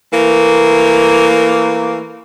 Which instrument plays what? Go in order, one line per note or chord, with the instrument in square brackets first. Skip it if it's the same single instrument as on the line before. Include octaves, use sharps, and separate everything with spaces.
[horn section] E3 A3 A#3